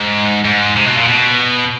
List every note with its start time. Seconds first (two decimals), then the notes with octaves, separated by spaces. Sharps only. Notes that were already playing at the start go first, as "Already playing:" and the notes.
Already playing: G#2
0.45 G#2
0.76 C3
0.86 B2
0.97 A#2
1.07 B2